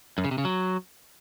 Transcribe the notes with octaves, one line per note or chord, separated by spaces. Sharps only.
F#2
C#3
C3
C#3
F#3